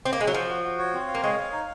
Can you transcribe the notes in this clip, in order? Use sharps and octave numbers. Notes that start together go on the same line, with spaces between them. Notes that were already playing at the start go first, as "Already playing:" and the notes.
C4
A#3
G#3
F#3
F3 F#4
F#4
F#4
C#5
C4
F5
A#3
G#3 C#5
F5
D#4